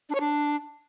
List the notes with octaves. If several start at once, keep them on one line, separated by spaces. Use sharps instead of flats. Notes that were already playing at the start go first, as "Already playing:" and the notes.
D4
C#5
D4